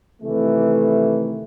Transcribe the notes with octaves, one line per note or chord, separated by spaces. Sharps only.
C3 D#3 E3 A3